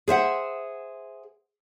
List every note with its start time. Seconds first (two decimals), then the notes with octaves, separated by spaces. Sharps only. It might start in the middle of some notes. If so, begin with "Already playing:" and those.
0.08 G#4 C5 E5 F#5